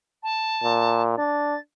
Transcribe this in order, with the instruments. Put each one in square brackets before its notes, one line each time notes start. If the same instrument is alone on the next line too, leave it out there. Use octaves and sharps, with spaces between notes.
[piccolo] A5
[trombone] A#2
[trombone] D4 [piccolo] A6